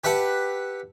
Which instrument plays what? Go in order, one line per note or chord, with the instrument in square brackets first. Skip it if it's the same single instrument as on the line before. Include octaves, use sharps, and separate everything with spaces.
[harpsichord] G4 B4 E5 F#5 A5